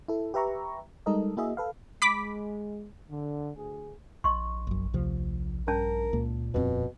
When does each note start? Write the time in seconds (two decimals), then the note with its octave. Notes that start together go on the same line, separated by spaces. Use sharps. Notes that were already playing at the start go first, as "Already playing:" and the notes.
0.08 E4 A4
0.34 G4 B4 E5 A#5 C#6
1.06 G3 G#3 D#4 A4 A#4 D#5
1.37 A#3 E4 F#4 G#4 D#5 E5
1.57 A4 B4 F5
2.02 G#3 B5 D6 B6
3.10 D3
3.56 D2 G#4
4.24 A#1 D#5 C6 C#6
4.67 F#1 F#2
4.94 D2 C3 F3
5.68 G2 C#4 A#4 D5 A5
6.13 C#2 A#2 A#3
6.54 D#1 F2 B2 C4